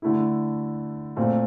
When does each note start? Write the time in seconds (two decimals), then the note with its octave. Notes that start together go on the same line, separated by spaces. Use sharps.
0.02 D3 A3 E4
1.16 A#2 A3 C4